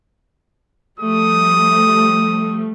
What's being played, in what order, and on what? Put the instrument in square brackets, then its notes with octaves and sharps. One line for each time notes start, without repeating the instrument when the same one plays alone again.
[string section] F3 G3 A3 [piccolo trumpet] D#6